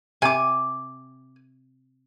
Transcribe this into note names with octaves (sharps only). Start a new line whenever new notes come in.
C3 G#5 D6